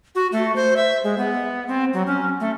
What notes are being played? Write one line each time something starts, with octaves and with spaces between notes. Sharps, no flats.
F#4
A3
C5
E5
G#3
B3
C4
F#3
C#4
A3